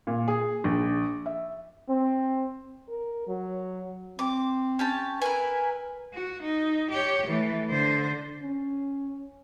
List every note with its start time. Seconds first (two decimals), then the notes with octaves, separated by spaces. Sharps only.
0.07 A#2
0.28 G#4
0.64 A#1
1.26 E5
1.88 C4
2.89 A#4
3.28 F#3
4.19 C4 D6
4.79 C#4 G4 A5
5.22 E4 A#4 B4 G#5
6.14 F#4
6.43 D#4
6.91 G4 C#5
7.27 E3 A3
7.69 D3 C5
8.43 C#4